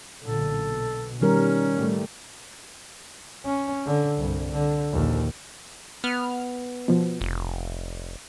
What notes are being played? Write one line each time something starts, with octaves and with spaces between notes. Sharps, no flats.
B1 A#2 D3 A4
B2
D#3 G3 C#4 A#4
A2 G3 A3
C#4
D3
C2 G2
D3
A#1 D#2
B3 F6
B2 F3
F1